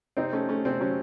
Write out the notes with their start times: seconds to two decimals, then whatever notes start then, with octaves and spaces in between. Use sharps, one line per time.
0.17 C3 C4 D#4
0.33 A3 C#4
0.49 A3 C#4
0.65 C3 C4
0.80 F#3 C#4